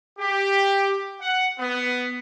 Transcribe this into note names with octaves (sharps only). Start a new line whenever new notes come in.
G4
F#5
B3